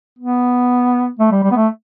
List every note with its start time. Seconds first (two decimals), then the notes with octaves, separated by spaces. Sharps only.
0.19 B3
1.19 A3
1.32 G3
1.44 G3
1.51 B3
1.56 A3